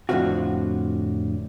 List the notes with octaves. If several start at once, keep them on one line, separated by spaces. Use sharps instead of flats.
F2 A2 D3 C4 F4 F#4